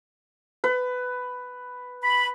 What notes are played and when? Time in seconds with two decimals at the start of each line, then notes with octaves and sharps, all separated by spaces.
0.64 B4
2.03 B5